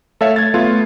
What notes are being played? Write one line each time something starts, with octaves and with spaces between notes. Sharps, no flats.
A3 A4 C#5 E5 F5
G#6 A6
A3 B3 F4